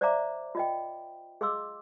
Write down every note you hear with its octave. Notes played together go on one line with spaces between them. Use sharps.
C5 D5 E5 F5 A#5 D6
F4 D#5 G5
G#4 D#5 F5 C6 D6 E6